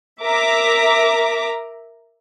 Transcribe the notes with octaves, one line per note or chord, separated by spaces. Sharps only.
A#4 E5 A#5 D6